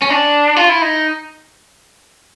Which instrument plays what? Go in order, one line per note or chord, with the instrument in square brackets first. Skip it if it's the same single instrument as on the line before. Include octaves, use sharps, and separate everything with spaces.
[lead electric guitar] C#4
D4
F4
E4
D#4